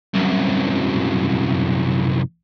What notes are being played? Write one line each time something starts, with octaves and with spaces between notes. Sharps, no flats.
C2 F#2